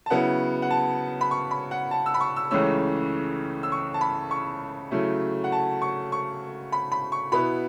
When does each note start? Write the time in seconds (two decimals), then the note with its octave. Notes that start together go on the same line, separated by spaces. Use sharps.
0.06 A5
0.10 C#3 F#3 B3 E4 F#5
0.62 F#5
0.71 A5
1.21 B5
1.31 C#6
1.51 B5
1.71 F#5
1.91 A5
2.06 E6
2.14 B5
2.20 C#6
2.36 E6
2.51 C#2 C#3 E3 A3 C#4 E6
3.63 E6
3.72 C#6
3.94 A5
4.01 B5
4.31 C#6
4.91 C#3 F#3 A3 E4
5.44 F#5
5.52 A5
5.82 C#6
6.12 C#6
6.72 B5
6.92 B5
7.12 C#6
7.32 B2 B3 E4 B5